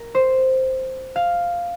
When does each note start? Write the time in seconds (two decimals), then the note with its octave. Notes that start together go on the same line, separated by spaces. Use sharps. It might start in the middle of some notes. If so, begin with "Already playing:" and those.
Already playing: A#4
0.15 C5
1.16 F5